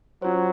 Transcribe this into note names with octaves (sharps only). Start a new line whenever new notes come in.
F#3 C#4 F4 C5